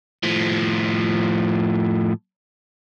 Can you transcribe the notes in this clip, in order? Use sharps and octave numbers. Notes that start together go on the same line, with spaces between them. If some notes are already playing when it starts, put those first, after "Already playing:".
A2 F3